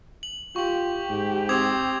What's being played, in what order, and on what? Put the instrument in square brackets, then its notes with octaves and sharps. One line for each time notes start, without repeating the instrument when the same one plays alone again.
[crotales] F#7
[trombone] F4 [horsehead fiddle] G4 [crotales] C#6 F#7
[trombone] G#2
[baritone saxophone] C4 [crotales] D6 D#6 G#6